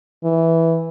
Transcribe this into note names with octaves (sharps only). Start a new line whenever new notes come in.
E3